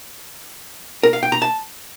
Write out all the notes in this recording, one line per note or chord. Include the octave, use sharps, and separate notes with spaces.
A#4
F5
G5
A#5
A5